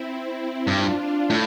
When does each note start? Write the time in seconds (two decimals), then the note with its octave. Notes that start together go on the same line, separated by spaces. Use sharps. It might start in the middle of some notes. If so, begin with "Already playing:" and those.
Already playing: C4 E4
0.67 G2 D4 F4
1.30 A2